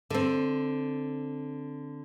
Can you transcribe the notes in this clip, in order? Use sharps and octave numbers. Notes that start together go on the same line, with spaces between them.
D3 C4